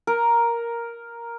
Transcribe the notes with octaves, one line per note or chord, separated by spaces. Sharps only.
A#4